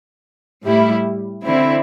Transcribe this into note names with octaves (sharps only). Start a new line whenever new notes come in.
A2 G3 E4
D3 C4 E4